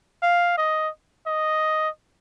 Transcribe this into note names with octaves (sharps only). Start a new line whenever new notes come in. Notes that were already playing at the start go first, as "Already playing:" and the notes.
F5
D#5
D#5